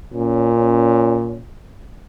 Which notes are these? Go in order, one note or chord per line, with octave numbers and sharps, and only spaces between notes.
A#2 C#4